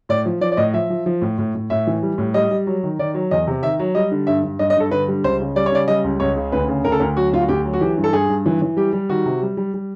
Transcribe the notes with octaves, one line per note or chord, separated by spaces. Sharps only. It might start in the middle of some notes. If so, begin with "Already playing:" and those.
A2 D5
F3
F3 D5
D5
A2 D#5
F3 E5
F3
F3
A2
A2
A2
A2 E5
E3
G3
A2
G3 D#5
G3
F#3
D#3
D#3 D5
F#3
E2 D#5
C3
D#3 E5
F#3
G3 D#5
D3
G2 E5
G2
G2 D#5
D#5
G2 A4
D3 B4
G3
C#2 C5
C#3
G3 D5
C#5
C#3 D5
G3 D#5
C#2
C#2 C#5
C#3
D2 B4
C#3
D2 A#4
A4
D2 A#4
F#3 F#4
D2 F4
F#4
D2 G4
F#3
F#4
E3 G4
G2
A4
G2 G#4
G2
E3
E3
G3 G4
G3
D#3 F#4
C3
G3
G3
G3